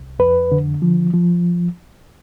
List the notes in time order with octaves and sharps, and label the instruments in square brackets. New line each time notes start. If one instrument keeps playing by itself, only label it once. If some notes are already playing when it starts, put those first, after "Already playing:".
Already playing: [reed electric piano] C2
F2 B4
D3
F3
F3